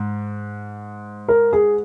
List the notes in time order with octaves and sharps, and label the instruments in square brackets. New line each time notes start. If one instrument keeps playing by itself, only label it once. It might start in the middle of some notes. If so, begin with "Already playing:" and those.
Already playing: [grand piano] G#2
[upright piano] A#4
G#4